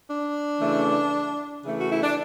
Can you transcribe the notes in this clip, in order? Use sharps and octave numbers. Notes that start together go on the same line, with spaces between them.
D4
C#3 E3 A3
C#3 E3 A3
F#4
E4
D4